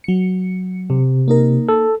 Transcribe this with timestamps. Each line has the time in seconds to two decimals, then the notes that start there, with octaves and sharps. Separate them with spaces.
0.04 F#3 C#7
0.90 C3
1.28 A#3 D#4 A#4
1.69 A4